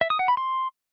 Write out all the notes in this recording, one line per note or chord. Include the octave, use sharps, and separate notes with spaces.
E5
D#6
F#5
B5
C6